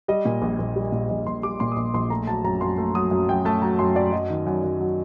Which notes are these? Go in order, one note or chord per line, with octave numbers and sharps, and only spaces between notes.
G3 D#5
A#2
A#1
A#1
G3
A#2
A#1 D#5
A#1 C6
G3 D6
A#2 C6
D#6
A#1 D6
A#1 C6
A3 A#5
F#3 A5
F#2 A#5
F#2 C6
A3
F#3 D#6
F#2
F#2 G5
A3 A5
F#3 A#5
F#2 C6
F#2 D5
F#3 D#5
D#3
F#2
F#2
F#3